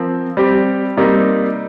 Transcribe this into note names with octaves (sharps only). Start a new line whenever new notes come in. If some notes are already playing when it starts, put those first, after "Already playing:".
Already playing: F3 C4 A#4
G3 C4 G4
C3 G3 A#3 D#4